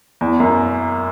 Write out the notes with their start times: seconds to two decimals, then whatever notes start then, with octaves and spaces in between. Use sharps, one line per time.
0.21 E2
0.40 F#2